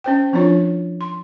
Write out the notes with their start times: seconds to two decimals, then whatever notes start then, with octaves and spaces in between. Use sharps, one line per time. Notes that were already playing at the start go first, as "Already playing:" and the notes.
0.04 C#4 C5 G5
0.33 F3 C4 D4 E4 F4 C#5
1.01 C6